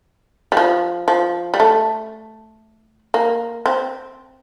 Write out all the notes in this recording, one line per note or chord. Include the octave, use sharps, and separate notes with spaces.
G3
F3
F3
G3
A3
A#3
C4